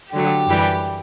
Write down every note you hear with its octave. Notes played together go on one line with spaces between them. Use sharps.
D3 F#3 A3 G4
F#2 E3 G3